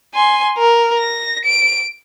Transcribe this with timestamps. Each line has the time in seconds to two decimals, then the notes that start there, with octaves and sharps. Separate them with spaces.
0.14 G#5 C6
0.58 A#4
0.98 A#6
1.45 D7